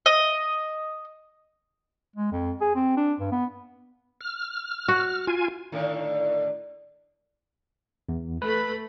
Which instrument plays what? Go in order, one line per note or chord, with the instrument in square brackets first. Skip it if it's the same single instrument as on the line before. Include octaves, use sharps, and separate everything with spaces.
[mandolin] D#5
[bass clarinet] G#3
F2
G#4
C4
D4
G2
B3
[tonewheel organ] F6
[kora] F#4
[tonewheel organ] F4 G#5
[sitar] A2 D3 D#3
[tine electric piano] E2
[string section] A3 B5 [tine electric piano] B4